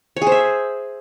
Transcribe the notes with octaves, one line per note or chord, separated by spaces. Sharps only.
C#5
G#4
C5
E5